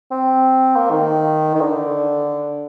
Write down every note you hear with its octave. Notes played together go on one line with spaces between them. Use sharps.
C4
A#3
D#3
D#3
D3